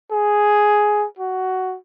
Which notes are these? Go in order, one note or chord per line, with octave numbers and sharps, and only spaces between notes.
G#4
F#4